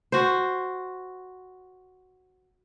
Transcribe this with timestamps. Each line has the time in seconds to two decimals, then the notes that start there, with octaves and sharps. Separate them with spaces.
0.12 F#4 C5